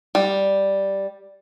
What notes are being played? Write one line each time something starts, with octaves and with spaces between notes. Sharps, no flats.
G3